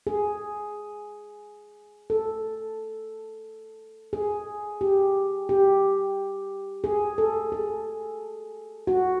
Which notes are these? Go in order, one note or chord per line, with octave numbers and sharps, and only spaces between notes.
G#4
A4
G#4
G4
G4
G#4
A4
G#4
F#4